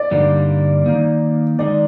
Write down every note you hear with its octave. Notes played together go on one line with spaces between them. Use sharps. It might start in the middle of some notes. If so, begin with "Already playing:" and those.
Already playing: D5
G2 D3 G3 A#3 D#4
D#3 A#3 D#4
D#3 G#3 D#4 G#4 D5